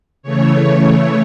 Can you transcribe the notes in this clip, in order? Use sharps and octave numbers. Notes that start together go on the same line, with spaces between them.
C#3 E3 A3 C#5